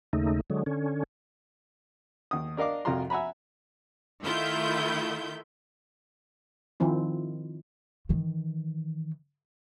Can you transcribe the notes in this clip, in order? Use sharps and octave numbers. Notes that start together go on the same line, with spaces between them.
D#2 C#3 A3 D#4
D3 F#3 G#3
D3 C#4
D#2 D#6
D4 A#4 D#5 F5 D6
C2 F2 F4 F#4 A#5 C6
E5 F#5 G#5 A#5 B5
D#3 A3 E4 F4 E5 G6
D#3 F3 C4 E4
D#3 E3